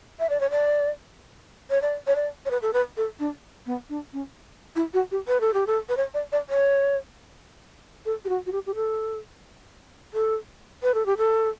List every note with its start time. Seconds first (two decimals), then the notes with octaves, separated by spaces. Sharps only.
0.20 E5
0.30 D5
0.40 C#5
0.50 D5
1.70 C#5
1.82 D5
2.07 C#5
2.16 D5
2.45 C#5
2.51 B4
2.62 A4
2.73 B4
2.97 A4
3.19 D4
3.66 B3
3.89 D4
4.13 C#4
4.75 E4
4.94 F#4
5.11 G4
5.28 B4
5.41 A4
5.54 G4
5.67 A4
5.89 B4
5.97 C#5
6.14 D5
6.32 D5
6.49 C#5
8.05 A4
8.25 G4
8.29 F#4
8.46 F#4
8.52 G4
8.66 G4
8.75 A4
10.14 A4
10.83 B4
10.94 A4
11.06 G4
11.18 A4